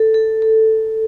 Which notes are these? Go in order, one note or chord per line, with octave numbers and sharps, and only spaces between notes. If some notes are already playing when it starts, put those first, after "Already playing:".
Already playing: A4
A4
A4